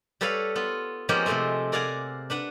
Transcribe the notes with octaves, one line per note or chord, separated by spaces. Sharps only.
G3 A4 B4 C#5 F5
B3 F4
F3 G#3 A#3 B3 C#4 G4
C3 F3 G#3 A3 C4
A#4 D5 F5 F#5 G#5
D4 B4 F#5